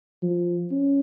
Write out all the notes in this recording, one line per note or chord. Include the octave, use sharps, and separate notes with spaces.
F3
C#4